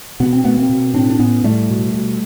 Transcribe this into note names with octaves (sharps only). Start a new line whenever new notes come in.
B2 B3
C4
B2 A3 B3
A#3 C4
B2
A2 C4 D4
D4
A2 B3 C#4
A2 G3 A3
B2
B2